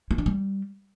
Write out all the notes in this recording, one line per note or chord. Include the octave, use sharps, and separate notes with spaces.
E4
D4
G3